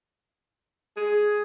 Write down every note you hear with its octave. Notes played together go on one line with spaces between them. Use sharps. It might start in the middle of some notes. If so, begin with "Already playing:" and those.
G#4